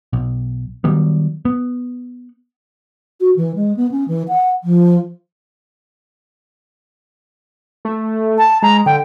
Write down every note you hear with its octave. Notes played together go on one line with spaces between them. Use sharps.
B1
D#3 F#3 G3 B3
B3
F#4
E3
G#3
B3
C#4
E3
F#5
F3
A3
A5
G#3 A#5
D3 G5